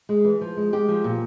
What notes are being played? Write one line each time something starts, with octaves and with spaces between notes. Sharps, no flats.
G#3
E3
F3
G#3
G#3 G4
F3
A#2